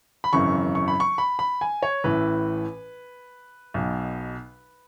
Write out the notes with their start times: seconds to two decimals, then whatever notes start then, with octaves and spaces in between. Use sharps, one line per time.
0.24 B5
0.33 G#1 F#2 C#3 E3 C#6
0.75 C#6
0.88 B5
1.00 C#6
1.18 B5
1.39 B5
1.61 G#5
1.83 C#5
2.04 A1 A2 E3 B4
3.74 B1 B2